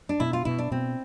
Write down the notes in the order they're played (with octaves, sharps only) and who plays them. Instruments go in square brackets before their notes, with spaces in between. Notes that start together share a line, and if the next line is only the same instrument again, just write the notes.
[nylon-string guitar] D4
[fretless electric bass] B2 [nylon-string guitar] E4
[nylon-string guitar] F4
[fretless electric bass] B2 [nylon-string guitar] E4
[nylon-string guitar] D4
[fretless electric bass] B2 [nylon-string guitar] C4